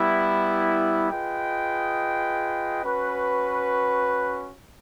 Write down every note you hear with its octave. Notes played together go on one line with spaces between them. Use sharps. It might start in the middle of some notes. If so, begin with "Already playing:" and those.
Already playing: G3 B3 E4
F4 G#4 B4 D#5 G5
C#4 F#4 B4